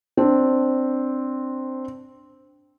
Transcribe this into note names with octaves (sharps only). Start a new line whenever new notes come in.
C4 D4